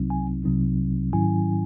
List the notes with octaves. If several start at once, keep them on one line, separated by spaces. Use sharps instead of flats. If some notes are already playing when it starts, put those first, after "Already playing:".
Already playing: C2 C3 F#3 C4 D#4
G#5
C2 C3 F#3 C4 D#4
G#2 D#3 F#3 C#4 E4 G#5